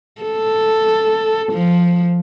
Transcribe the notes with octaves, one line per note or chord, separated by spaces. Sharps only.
A4
F3